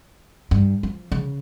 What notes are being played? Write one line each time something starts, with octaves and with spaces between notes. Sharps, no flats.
G2
F3
C#3